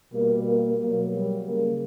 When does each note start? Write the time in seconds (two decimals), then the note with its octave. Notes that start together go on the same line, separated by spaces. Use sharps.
0.13 B2 G3 A#3
0.47 A#3
0.80 B2 F#3 A#3
1.13 G3
1.47 C#3 G3 A#3